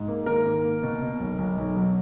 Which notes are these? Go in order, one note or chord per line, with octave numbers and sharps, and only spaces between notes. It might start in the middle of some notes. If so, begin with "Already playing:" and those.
Already playing: G#2
A#3
D#3 A#4
A#3
A#3
B2
B2
B1
B1
B1
F#3